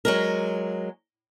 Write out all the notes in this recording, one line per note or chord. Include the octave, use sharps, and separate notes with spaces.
F#3 G#3 A#4